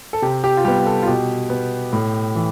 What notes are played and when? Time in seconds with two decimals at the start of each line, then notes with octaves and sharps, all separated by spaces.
0.13 A4
0.22 C3 G4
0.44 G4
0.57 F4
0.65 G3 B3 G4
0.86 A4
1.03 F4
1.07 B2 G4
1.50 B3
1.93 A2
2.35 E3